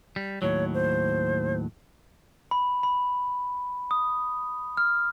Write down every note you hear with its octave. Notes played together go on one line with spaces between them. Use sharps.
G3
D#2 A2 F#3 C#5
C5
B5
B5
D#6
F6